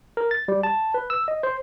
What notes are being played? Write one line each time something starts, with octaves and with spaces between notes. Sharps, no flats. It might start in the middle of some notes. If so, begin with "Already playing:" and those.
A#4
A6
G3
A5
B4
E6
D#5
C5